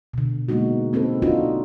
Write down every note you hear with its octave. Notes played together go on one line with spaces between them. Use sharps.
B2 D3
G#3 A#3 B3 D#4 F#4
A#3 C4 D#4 A4 B4
D4 D#4 F4 F#4